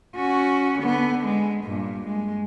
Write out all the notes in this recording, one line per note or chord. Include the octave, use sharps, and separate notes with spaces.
C#4 F#4
D3 B3
G#3
G2 A#2
G#3